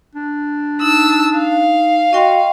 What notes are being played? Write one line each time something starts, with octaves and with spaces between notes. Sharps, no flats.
D4
D#4 A5 E6
F5
F#4 D#5 G5 C6